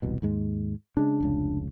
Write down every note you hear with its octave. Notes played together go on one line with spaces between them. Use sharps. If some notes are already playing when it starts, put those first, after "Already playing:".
E1 C2 B2
D#2 G#2 G#3
C#3 G#3 D4
F1 C#2 C#3